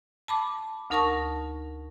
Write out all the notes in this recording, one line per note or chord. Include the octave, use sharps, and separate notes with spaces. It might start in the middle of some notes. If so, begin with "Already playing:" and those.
A5 B5 D6
D2 D#4 A#4 A5 C#6 A#6